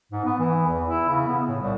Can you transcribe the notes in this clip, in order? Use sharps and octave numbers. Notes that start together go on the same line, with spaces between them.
G#2
B3
E3
E2
E4
C#3
B3
A2
C2